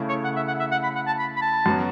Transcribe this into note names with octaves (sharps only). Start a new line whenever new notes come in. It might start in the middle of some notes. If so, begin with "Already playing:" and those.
Already playing: C#3 A3 E4
C#5
F#5
E5
F#5
E5
F#5
B5
F#5
A5
B5
B5
A5
F#2 F#3 B3